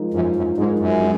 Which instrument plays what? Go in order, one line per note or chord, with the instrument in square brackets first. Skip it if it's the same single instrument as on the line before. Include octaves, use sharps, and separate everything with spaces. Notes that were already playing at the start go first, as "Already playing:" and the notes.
Already playing: [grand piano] F3 G#3 D#4 A#4
[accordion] F#2 [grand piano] F3
[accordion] F#2
[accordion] G#2 [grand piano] G#3 D#4 A#4
[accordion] F#2
[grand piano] G#3